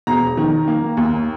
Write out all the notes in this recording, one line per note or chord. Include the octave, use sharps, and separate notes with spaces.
E1 A#5
D#3
A#3
D#2